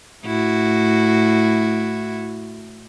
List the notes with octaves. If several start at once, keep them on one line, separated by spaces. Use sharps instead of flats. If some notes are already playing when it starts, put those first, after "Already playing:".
A2 E4 F#4